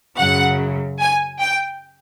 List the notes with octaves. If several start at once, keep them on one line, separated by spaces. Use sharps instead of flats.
F#2 C#3 F#3 F#5
G#5
G5